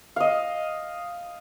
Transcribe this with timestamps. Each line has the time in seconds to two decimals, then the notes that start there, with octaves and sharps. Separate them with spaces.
0.16 D#5 F5